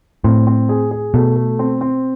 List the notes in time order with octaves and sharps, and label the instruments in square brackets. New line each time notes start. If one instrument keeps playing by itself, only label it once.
[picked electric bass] A2 [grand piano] C4
[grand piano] C4
G#4
G#4
[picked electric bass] B2 [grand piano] A3
[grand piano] A3
C4
C4